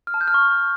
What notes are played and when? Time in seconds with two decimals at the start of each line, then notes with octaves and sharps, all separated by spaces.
0.07 F6
0.14 A5
0.21 G6
0.28 F6
0.34 C#6